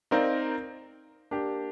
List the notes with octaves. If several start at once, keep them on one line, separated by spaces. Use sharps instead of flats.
C4 D#4 A#4 D5 F5
A#3 D4 G4